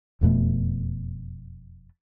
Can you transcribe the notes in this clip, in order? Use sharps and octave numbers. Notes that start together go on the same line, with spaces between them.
E1 F2 B2 A3